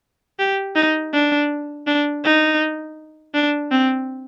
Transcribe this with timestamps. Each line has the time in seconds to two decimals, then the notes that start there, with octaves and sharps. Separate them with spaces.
0.39 G4
0.76 D#4
1.14 D4
1.87 D4
2.25 D#4
3.35 D4
3.72 C4